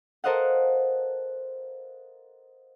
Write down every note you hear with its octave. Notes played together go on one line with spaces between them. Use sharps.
A4 A#4 C5 D#5 F5 F#5